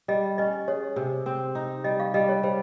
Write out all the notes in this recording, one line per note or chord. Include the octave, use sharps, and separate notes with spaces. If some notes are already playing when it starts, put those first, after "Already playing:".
G3 D#5
C#4 D#5
G#4 C#5
C3
C4
D#4
G3 D#5
F5
G3 D#5
C#5
G3 C5